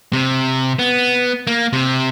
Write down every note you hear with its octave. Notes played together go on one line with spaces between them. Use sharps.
C3
B3
A#3
C3